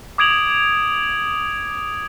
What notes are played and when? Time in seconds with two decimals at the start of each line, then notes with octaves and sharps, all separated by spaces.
0.18 D6 D#6 G#6 D7 F7 F#7